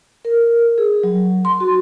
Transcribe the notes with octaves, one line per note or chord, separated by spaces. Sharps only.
A#4
G#4
F#3
C6
F#4